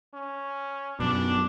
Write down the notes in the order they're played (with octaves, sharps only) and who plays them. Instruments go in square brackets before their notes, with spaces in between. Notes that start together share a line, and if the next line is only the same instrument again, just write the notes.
[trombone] C#4
[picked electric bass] F#2 B2 [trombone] D4